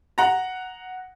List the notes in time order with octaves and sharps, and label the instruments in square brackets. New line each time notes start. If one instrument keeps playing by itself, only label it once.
[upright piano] F#5 A#5